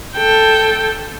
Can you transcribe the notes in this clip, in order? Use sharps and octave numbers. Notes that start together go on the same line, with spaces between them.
A4 G5